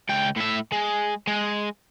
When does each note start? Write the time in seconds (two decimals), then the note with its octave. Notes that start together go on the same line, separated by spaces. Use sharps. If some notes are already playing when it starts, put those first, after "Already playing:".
0.09 C#2 G5
0.36 A2 E5
0.72 G#3
1.27 G#3